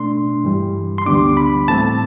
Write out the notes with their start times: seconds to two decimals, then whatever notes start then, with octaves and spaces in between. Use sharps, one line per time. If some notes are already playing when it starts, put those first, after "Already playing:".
Already playing: B2 A3 D4 C6
0.44 G2 E3 G3
0.98 C6
1.06 D2 D3 G3 B3 D4 D6
1.37 B5
1.68 A2 E3 A3 C4 A5